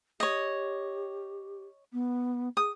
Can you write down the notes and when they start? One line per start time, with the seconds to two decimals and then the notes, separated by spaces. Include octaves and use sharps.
0.20 G4 C#5 D#5
1.93 B3
2.57 G#4 D#6